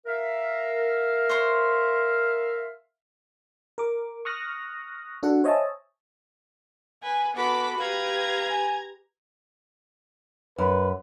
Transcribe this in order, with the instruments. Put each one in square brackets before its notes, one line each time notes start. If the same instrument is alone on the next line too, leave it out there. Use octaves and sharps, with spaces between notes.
[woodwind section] A#4 E5 F5
[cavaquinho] C5 C#5 C6
[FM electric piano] A#4 D6
C#6 D#6 F6 F#6 A#6
D4 F#4 A4 D5 F#5
C5 C#5 D#5 E5 G#5 A5
[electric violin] B4 [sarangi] G#5
[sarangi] B3 [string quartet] F#4 A4 B5 [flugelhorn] B4 [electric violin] D6 B6
[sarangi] G4 [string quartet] B4 [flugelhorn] F5 [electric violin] A#5 G#6
[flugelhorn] G#5
[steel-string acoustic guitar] F#2 [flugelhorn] B4